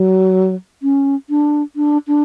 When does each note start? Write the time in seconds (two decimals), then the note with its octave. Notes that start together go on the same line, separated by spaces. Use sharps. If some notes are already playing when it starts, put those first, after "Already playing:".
Already playing: F#3
0.83 C#4
1.30 D4
1.76 D4
2.07 D4